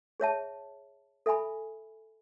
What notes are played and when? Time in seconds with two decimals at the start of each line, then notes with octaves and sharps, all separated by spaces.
0.20 G#4 C#5 E5 A5
1.26 A4 E5 G#5 B5